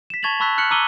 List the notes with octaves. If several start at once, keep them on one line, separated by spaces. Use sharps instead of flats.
B6 E7
A5 C#6 G#6 A6 F7 F#7
A5 B5 C#6 E6 F#6 B6
F6 F#6 C#7 F#7
A#5 D6 E6 D#7 F#7 G7